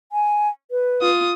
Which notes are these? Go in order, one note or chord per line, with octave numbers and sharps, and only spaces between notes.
G#5
B4
F4 D#6